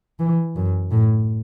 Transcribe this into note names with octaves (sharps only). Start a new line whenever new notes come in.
E3
F#2
A2